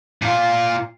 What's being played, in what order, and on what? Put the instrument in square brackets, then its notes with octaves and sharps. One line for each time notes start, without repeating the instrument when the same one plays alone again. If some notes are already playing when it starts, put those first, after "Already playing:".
[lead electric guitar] A#2 F4